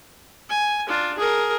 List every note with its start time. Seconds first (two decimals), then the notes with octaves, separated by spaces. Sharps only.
0.50 G#5
0.88 D4 F4
1.18 G#4 A#4